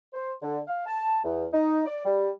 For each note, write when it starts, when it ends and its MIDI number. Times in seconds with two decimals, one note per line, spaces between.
0.14 0.33 72
0.42 0.58 50
0.68 0.82 77
0.86 1.18 81
1.24 1.46 40
1.53 1.81 63
1.85 2.04 74
2.05 2.29 55